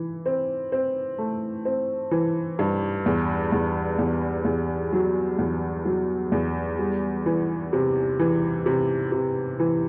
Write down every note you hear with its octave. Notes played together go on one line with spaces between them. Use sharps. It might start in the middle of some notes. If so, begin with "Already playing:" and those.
Already playing: E3
C4
C4
A3
C4
E3
G2
E2
E2
E2
E2
F#3
E2
F#3
E2
G3
E3
C3
E3
C3
C3
E3